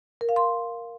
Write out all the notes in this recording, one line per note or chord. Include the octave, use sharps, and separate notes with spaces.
A#4
F5
C6